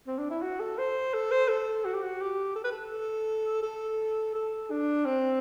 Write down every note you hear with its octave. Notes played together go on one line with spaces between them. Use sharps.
C4
D4
E4
F#4
A4
C5
A4
C5
A4
F#4
G4
F#4
G4
A4
B4
A4
A4
A4
D4
C4